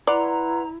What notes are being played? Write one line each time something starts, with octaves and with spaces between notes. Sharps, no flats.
E4 B4 D5 F#5 A#5 C6